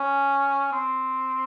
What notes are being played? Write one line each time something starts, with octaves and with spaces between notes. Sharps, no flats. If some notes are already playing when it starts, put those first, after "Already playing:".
Already playing: C#4
C4